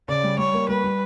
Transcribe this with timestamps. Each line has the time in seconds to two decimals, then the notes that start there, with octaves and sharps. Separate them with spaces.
0.08 C#3 D5
0.23 G3
0.38 G3 C#5
0.54 A#3
0.69 G3 B4
0.84 G3